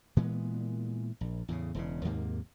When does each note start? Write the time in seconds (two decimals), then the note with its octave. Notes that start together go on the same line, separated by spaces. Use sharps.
0.17 A#2 E3 G#3 B3
1.21 A#1
1.48 E2 A2 C#3
1.75 E1 E2 C#3
2.05 D#2 G#2 C3 A#3